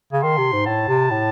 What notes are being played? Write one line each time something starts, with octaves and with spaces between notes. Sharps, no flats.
C#3
D#3 C6
C3
G#2
A2 A5
C3
A2